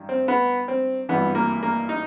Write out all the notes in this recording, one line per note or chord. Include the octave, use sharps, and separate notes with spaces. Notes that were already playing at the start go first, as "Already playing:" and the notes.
Already playing: G2 D#3
C4
B3
C4
G#1 G2 E3 B3
A#3
A#3
D#4